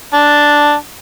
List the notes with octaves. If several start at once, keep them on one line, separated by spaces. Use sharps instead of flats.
D4